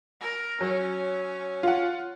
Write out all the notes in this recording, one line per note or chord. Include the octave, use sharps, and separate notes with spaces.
A#4
F#3 C#4
F4 F#5